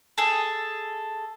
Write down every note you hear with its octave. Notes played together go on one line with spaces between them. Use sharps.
G#4 A4